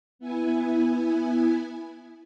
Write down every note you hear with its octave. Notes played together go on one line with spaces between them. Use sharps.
B3 E4 G#5